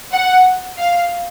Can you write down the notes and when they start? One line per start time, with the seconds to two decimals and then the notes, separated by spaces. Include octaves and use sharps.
0.12 F#5
0.78 F5